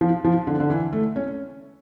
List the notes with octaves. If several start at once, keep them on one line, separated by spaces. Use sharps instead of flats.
F3
F3
D3
D3
E3
A3
C#4